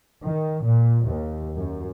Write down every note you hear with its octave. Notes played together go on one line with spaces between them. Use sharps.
D#3
A#2
D#2
F#2